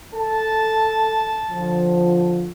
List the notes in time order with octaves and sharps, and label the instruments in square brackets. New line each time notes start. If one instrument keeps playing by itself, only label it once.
[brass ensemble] A4 [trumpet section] A5
[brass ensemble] D3 F3